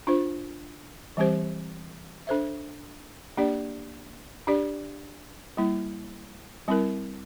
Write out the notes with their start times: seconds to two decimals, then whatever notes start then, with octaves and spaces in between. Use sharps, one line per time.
0.07 D4 F4 C5
1.17 E3 G3 C4 G4 C5
2.27 D4 A4 C5 E5
3.37 A#3 D4 G4 D5
4.47 D4 G4 D5
5.57 G3 A#3 E4
6.68 G3 C4 E4 A#4